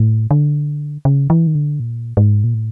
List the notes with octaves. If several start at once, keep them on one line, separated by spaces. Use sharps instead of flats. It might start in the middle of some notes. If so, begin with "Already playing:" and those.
Already playing: A2
D3
C#3
E3
D#3
D3
A#2
G#2
A#2
A2